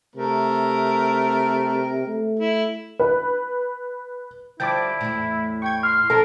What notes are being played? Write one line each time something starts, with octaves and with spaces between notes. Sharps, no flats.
C3 A3 A#4
A3
E4
B4
D3 F3 G3 E4 G5 A5 D6
E2 A2
G5 C#6 G#6
C6 F6
F3 C#4 A4 A#4 A5